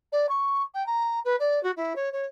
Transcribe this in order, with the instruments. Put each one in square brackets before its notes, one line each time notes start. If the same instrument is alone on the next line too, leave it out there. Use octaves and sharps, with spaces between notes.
[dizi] D5
C#6
G5
A#5
B4
D5
F#4
E4
C#5
C#5